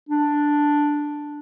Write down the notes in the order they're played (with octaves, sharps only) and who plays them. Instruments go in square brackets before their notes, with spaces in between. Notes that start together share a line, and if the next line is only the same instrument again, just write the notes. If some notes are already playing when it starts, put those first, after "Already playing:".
[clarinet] D4